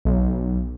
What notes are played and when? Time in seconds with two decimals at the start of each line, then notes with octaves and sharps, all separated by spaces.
0.05 B1